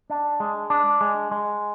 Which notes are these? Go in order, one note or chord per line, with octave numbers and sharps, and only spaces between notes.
D4
G#3
D4
G#3
G#3